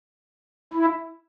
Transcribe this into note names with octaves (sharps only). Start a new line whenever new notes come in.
E4